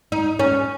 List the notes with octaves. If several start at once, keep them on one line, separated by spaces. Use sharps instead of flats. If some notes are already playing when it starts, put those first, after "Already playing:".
D#4
C#4